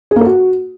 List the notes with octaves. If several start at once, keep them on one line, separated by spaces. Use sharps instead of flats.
G#4
A#3
A4
F#4